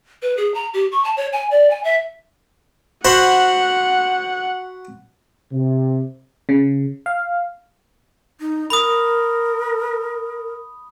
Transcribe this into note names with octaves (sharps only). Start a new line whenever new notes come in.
B4
G#4
A#5
G4
C#6
A5
C#5
G#5
D5
G#5
E5
F#4 C5 F#5 B5 C6
C3
C#3
F5
D#4
A#4 B5 D#6